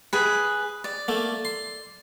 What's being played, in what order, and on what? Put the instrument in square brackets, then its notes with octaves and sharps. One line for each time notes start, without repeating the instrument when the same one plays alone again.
[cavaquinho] G#4 B4
D5
[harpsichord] A3 A#3
C6